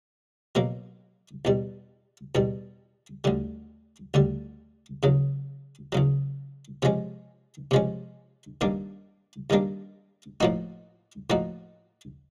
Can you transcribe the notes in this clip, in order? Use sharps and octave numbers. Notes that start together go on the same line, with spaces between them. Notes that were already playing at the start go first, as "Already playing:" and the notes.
B2 F#3 A#3
E2 B2 G3
E2 B2 G3
D2 D3 G3
D2 D3 G3
E2 C#3 F#3
E2 C#3 F#3
C3 F3 G#3 C#4
C3 F3 G#3 C#4
G2 D#3 G3 A#3 D4
G2 D#3 G3 A#3 D4
A2 F3 A#3 D#4 F#4
A2 F3 A#3 D#4 F#4